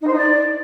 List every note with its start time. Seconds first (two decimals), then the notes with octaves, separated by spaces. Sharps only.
0.02 D#4
0.07 C5
0.12 D#4
0.17 D5